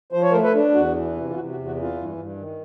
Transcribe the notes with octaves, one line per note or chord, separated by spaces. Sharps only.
F3 C5
C#5
A3 A#4 C5
A4 B4
D4
E2 F#4
E3
C3
F4
C3 F#4
F#4
E2
F#4
E3
F4
G2
G2
D#3